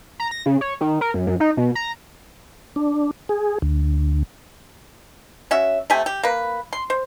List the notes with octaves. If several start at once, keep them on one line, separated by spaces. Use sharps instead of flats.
A#5
A#6
C#3
C#5
D#3
A#4
F#2
F#2
D#4
B2
A#5
D4
G#4
D2
C#4 F#4 E5
C3 A3 G4 G#5
G4
A#3 B4
C6
C5